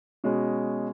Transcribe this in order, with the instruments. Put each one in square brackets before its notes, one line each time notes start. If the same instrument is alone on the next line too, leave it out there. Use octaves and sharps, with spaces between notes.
[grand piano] B2 G#3 C#4